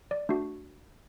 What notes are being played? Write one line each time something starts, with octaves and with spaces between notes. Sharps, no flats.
D5
A3 D4 F#4